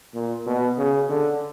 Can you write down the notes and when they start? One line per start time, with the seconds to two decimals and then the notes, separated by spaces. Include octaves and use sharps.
0.14 A#2
0.46 B2
0.78 C#3
1.10 D3